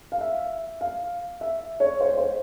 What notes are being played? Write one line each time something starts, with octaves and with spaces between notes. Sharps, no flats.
F5
E5
F5
E5
C#5
C5
C#5
C5